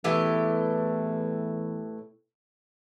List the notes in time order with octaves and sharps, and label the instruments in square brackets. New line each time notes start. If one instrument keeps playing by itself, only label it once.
[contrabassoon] E2 [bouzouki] A2 E3 G4